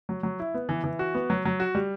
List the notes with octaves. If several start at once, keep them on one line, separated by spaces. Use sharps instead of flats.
F#3
F#3
E4
B3
E3
E3
F#4
B3
F#3
F#3
F#4
G3